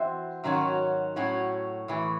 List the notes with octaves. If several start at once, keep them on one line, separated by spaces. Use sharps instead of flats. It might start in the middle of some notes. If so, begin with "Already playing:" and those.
Already playing: E3 C4 F#4 C5 E5
G#2 D#3 F#3 C#4 F#4
A2 F#3 C#4 F#4
A2 E3 A3